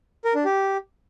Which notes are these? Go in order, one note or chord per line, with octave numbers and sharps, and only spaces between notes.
A#4
D4
G4